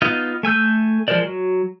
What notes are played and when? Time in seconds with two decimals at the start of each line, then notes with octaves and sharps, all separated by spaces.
0.02 B3 D#4 F4 D#5
0.43 A3 G#5 E6 G6
1.08 F3 G#3 A#4 C5 D5
1.24 F#3